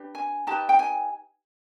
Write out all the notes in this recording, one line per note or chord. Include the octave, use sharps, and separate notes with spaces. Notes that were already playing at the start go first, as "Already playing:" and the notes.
Already playing: D4 G4 B4
G#5
D#4 G4 B4 A5
G5
G#5